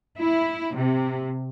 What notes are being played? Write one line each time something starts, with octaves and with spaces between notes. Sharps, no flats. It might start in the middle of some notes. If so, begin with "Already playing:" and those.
E4
C3